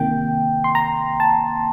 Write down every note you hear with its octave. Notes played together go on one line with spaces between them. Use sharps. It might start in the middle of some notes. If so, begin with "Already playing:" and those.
Already playing: C2 C3 D#3 A#3 G5
C6
A#5
A5